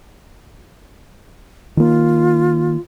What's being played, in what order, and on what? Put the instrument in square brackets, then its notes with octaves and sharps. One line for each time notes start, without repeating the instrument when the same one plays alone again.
[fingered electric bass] D#3 A#3 [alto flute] F4